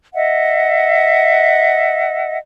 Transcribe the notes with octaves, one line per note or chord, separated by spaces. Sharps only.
D#5 E5 F#5